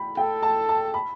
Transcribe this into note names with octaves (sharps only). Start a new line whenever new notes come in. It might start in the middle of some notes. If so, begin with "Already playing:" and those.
Already playing: G5 B5
A4 G5
A5
A5
B5